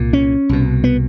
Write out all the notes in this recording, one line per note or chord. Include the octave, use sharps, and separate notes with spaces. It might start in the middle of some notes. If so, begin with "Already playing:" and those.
Already playing: C2 A#2
C#4
C2 B2
B3